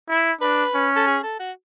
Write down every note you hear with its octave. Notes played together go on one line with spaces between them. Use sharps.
E4
D4 B4
C#4
A4
G#4
A4
F#4